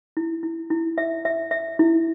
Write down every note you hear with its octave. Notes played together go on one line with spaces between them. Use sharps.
E4
E4
E4
E5
E5
E5
E4